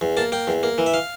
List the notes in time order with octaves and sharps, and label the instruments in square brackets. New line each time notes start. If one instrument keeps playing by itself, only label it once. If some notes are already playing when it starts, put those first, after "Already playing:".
[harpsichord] E2
A#3 A5
A#3 G5
E2
A#3
E3
E5
F5